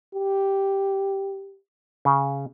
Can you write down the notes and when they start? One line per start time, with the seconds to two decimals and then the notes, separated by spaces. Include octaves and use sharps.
0.15 G4
2.05 C#3